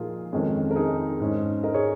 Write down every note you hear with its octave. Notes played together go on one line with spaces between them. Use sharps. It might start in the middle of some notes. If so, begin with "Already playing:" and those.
Already playing: A#2 F3 D#4 F4 G#4 A#4
F2 D#3 G#3 C#4
A#4
D#4 G#4
G#2 G#3 C#4
A#4 D#5
G#4 C#5